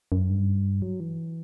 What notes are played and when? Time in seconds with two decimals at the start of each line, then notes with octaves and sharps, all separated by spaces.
0.12 F#2
0.30 G2
0.82 F#3
1.00 E3